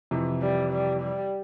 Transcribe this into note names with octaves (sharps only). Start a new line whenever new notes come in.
F2 C3 E3
G3
G3
G3